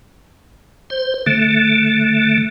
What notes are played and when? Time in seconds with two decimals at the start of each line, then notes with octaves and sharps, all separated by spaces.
0.90 C5
1.26 D3 A3